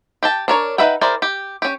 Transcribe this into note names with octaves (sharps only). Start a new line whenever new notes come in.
G4 G5 A5
D4 A#4 C#5
D#4 B4 E5 F#5 G5
E4 G#4 A#4 C5 D5
G4
C#4 G4